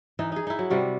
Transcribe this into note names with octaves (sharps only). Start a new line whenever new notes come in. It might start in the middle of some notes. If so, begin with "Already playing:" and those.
E3 D#4
D#4 G#4
D#4 E4
F#3
C3 G3 F#4